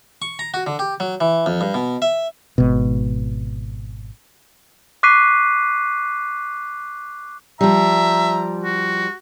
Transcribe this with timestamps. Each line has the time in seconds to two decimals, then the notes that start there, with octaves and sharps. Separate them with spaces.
0.22 C#6
0.39 A#5
0.54 F#4
0.67 D3
0.79 G4
1.00 F#3
1.21 E3
1.46 F2
1.61 G2
1.74 B2
2.02 E5
2.58 G#1 B2
5.03 C#6 D6 F#6 B6 C7 D#7
7.61 F3 G3 E5 A#5
8.64 F#4